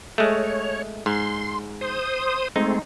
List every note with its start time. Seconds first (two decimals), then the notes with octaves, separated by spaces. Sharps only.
0.18 G#3 A3 C#5
1.06 G#2 C6
1.81 C5 D#6
2.56 G#3 A3 C4 D#4